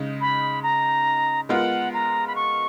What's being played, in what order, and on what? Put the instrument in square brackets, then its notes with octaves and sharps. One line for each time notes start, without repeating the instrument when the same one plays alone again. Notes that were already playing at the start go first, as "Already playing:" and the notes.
Already playing: [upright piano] C#3 G#3 D#4
[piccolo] B5
A#5
[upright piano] G#3 B3 F4 A#4 [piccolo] F#5
[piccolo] A#5
B5
C#6